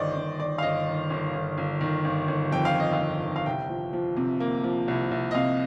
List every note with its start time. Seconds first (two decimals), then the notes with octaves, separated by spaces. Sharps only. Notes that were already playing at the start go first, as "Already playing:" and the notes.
Already playing: G1 D#3 C5 D5 D#5
0.16 G1
0.39 D#3 D5
0.58 F5
0.62 G1 D#5
0.87 D#3
1.10 G1
1.33 G1
1.57 G1
1.81 D#3
2.05 G1
2.28 G1
2.52 F2 G5
2.65 F5
2.76 G1 D#5
2.93 F5
2.99 F2
3.23 D#3
3.36 F5
3.46 C2 G5
3.69 F3
3.93 F3
4.16 C3
4.40 A#3
4.64 F3
4.88 C2
5.11 C2
5.31 D#5
5.35 C3 F5